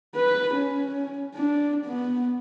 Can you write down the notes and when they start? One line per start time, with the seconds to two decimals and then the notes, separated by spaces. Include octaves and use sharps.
0.15 B4
0.54 C#4
1.35 D4
1.85 B3